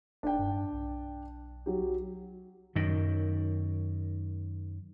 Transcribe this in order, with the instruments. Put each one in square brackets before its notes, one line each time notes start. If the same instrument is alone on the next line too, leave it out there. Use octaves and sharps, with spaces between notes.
[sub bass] E1 [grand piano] D4 G5
[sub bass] G2
B1
[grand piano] F#3 G4
[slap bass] F#2 D#3